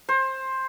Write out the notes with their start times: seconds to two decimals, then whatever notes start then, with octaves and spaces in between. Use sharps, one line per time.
0.09 C5